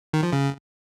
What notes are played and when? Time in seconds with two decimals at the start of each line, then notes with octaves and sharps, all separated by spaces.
0.13 D#3
0.23 F3
0.33 C#3